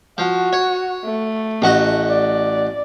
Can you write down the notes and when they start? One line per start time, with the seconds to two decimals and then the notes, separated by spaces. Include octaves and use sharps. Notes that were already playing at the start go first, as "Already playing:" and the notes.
0.18 F3 F#4
0.53 C#5
1.05 A3
1.62 A1 F#4 D#5
2.10 D5